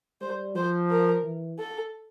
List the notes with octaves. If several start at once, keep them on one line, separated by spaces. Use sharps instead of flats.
G3 C5
F3 C5
A#4
E3
A4